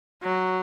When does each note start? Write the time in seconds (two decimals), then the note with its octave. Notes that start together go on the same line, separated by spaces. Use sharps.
0.23 F#3